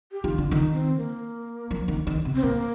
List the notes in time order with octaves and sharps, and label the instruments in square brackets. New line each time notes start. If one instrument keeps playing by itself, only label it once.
[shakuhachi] G4
[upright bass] D#3 [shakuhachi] F4
[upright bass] D3
D#3
[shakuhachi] C4
A#3
[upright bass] F3
D#3
D#3
C3
[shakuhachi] C4
[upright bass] A2 [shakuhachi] A#3